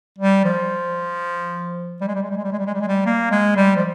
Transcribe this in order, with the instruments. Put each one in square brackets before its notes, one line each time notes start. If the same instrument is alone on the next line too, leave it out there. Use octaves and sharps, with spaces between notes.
[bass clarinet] G3
F3
G3
G#3
G3
G#3
G3
G#3
G3
G#3
G3
G#3
G3
G#3
G3
A#3
G#3
G3
F3